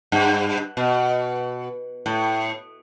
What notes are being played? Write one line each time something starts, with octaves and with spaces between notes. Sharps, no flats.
G2
B2
A2